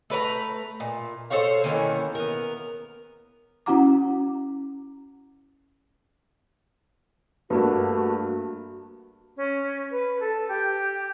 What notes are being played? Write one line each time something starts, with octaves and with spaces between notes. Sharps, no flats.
A3 B4 C#5 A#5
A#2
A4 C5 C#5 F5
D#3 E3 A#3 C#4
B3 A#4
C#4 E4 F#4 F#5 A#5 D6
G2 A3 A#3 F#4
C#4
B4
A4
G4